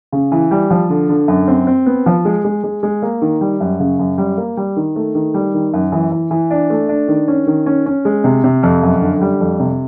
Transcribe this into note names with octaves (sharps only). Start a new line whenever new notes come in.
C#3
E3
G3
F3
D3
D3
F#2
C4
C4
B3
F3
G#3
G#3
G#3
G#3
A#3
D#3
G3
F#2
C#3
F#2
G3
A#3
G3
D#3
A3
D#3
G3
D#3
F#2
E3
E3
E3
D4
A3
D4
D#3
C#4
D#3
C#4
C#4
G#3
C3
C3
F2
F#2
D3
G3
F2
C3